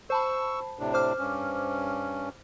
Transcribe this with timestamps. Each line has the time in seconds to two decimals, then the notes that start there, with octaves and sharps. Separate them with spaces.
0.10 C5 A5 B5 C#6 E6
0.79 A2 C3 D4
0.94 C5 D6 F6
1.19 G2 C#4